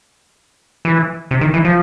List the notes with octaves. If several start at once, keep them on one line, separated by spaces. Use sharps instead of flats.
E3
C3
D#3
E3
F3